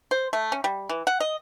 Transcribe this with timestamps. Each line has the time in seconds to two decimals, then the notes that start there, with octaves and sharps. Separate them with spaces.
0.11 C5
0.33 A3
0.52 C#4
0.64 G3
0.89 E3
1.07 F#5
1.20 D#5